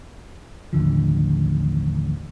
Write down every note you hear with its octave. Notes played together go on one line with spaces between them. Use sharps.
A1 D#2 D3 F3